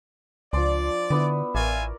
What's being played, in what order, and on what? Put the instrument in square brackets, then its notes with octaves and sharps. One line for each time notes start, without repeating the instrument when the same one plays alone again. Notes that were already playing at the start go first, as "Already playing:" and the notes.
[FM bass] C#2 [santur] F3 D4 C6 [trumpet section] D5
[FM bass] D3 [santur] B3 D4 E4
[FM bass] A1 [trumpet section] F4 E5 G#5 [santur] A#4 C#5 D5